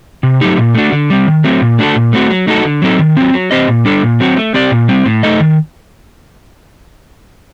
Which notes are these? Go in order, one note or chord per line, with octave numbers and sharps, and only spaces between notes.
C3
F#3 A3 D#4 G4
A#2
A3 D4 F#4
D3
G3 C4
D#3
F#3 A3 C4
A#2
A3 D4 F#4 A4
A#2
A3 C4 F#4
F#3
A3 D#4 F#4 A4
D3
F#3 C4 D#4 A4
D#3
F#3 C4
F#3
C4 G4 C5 D#5
A#2
G3 D4 A4
A#2
F#3 C4 F#4
A3
C4 G4 D5
A#2
G3 C4
A2
A3 D#4 A4 D#5
D#3